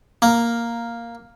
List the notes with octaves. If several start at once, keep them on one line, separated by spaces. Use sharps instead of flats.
A#3